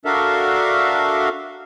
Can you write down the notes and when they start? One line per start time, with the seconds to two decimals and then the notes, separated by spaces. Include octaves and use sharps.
0.05 D4 F#4 A4 A#4 E5 F5